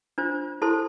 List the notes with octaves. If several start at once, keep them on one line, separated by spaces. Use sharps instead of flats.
D4 F4 C5
E4 A4 C5 A5 C6